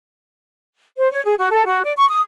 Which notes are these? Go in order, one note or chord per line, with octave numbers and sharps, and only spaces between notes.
C5
C#5
G#4
F#4
A4
F#4
D5
C#6
D#6